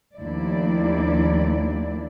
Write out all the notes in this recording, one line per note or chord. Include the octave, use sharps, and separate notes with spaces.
D#2 F3 A3 D4 E4 D5